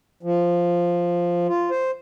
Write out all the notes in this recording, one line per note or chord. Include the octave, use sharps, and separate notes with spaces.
F3
F4
C5